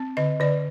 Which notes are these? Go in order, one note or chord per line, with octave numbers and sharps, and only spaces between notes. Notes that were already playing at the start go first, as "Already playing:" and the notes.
Already playing: C4
D3 D#5
D3 D5